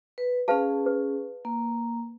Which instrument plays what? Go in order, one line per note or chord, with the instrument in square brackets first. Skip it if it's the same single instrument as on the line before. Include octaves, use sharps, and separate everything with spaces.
[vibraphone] B4
[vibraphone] C#4 G#4 [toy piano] B4 F5 A5
[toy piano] B4
[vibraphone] A#3